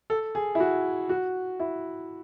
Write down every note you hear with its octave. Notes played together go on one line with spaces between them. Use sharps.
A4
G#4
E4
F#4
F#4
E4